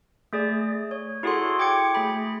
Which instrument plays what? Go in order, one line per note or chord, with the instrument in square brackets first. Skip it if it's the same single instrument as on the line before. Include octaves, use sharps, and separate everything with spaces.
[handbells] A3 G#4 D5
C#5
E4 F#4 G#4 A4 C#5 C6
G5 D6 G#6 C#7
A3 G#4 B5